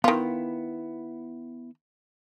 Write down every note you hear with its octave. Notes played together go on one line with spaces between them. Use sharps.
D#3 B3 E4 F4